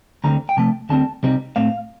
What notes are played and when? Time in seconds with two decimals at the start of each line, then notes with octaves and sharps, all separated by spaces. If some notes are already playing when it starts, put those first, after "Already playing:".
0.24 D2 D3 G3 C4 A#5
0.49 G5
0.57 C3 F3 A3 A5
0.89 D2 D3 G3 C4 A5
1.23 C2 C3 G3 C4 D#4
1.56 A2 A3 C4 F5